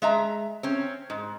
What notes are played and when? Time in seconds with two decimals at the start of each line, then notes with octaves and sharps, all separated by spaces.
0.02 G#3 E5 A#5
0.63 C4 C#4
1.10 G#2